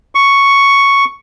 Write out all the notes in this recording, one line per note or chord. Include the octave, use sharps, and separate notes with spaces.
C#6